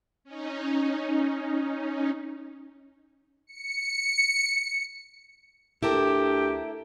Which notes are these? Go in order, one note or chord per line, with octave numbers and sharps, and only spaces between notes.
C#4 D#4
C#7
D2 E4 G4 A4 A#4